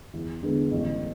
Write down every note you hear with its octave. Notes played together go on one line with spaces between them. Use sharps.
E2
D3 G#3 B3
A1